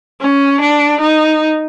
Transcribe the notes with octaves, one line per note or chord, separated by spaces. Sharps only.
C#4
D4
D#4